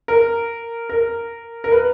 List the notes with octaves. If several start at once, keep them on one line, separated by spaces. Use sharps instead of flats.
A#4
A#4
A#4
B4